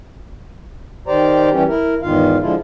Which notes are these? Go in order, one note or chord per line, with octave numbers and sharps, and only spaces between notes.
D#3 G4 C5 D5 A#5
E3 G3 C#4 G4
E4 A#4
E2 G#2 D#3 F4 F5
D3 F3 G#3 E4 F4